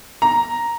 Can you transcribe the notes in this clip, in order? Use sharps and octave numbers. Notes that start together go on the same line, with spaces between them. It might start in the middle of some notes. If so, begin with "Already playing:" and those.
A#5